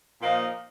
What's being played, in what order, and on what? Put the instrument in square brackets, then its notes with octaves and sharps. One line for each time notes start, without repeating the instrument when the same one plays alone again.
[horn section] A#2 F3 A#3 D#4